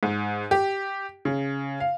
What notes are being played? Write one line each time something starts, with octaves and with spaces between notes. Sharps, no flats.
G#2
G4
C#3
F5